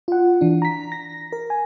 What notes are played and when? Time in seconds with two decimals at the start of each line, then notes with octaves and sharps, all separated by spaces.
0.08 F4 F#5
0.41 E3 D4
0.62 A#5 B6
0.92 A#6
1.32 A#4
1.50 G#5